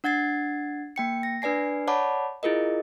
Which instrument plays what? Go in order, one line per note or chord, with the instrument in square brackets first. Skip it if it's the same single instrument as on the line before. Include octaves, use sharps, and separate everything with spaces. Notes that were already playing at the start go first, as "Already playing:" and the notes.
[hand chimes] D4 F#5 G#6 A6 C7
A#3 G5 C#7
A#6
D4 B4 D5 G#5 C7
C#5 D5 F#5 A5 B5 D6
E4 F4 G#4 A#4 D#5